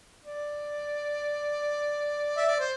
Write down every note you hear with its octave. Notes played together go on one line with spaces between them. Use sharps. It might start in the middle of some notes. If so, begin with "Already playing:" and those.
D5
E5
D5
C5